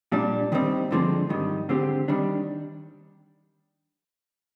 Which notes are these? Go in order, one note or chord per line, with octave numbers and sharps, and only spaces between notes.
A#2 G3 D4
D#2 D#3 G3 C4
G2 D3 F3 G#3 C4
G#2 D#3 G3
D3 G#3 C4 G4
D#2 D#3 G3 D4